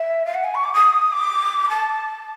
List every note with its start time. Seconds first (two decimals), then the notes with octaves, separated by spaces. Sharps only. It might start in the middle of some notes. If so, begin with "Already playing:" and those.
Already playing: E5
0.25 F5
0.34 F#5
0.43 G#5
0.54 C#6
0.63 D6
0.73 D#6
1.12 D6
1.69 A5